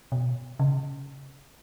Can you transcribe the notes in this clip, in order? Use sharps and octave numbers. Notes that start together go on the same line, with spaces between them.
B2
C#3